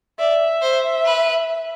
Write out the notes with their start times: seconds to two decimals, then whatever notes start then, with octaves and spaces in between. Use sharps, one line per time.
0.19 D5 E5
0.62 C5
1.05 B4